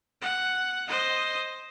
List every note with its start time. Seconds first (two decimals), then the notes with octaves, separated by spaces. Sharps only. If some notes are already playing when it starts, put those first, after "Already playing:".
0.22 F#5
0.89 C5 D#5